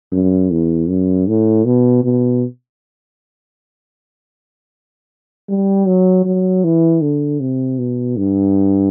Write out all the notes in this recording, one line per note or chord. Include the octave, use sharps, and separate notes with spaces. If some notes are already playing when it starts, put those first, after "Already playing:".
F#2
E2
F#2
A2
B2
B2
G3
F#3
F#3
E3
D3
C3
B2
G2